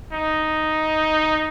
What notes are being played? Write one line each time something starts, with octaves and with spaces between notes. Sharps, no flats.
D#4